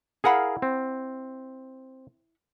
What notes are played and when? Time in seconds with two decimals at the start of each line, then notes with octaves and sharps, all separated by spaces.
0.24 E4 G#4 A#4 F5 F#5 B5
0.62 C4